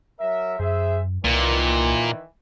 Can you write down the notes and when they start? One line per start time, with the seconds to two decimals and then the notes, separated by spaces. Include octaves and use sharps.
0.20 F#3 A#4 E5
0.59 F#2 G#4 C5 E5
1.24 C2 A#2 D#3 E3